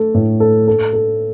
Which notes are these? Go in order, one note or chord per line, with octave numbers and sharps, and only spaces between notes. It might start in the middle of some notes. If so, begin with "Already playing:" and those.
Already playing: A3 A4
A2
A4
A4
A4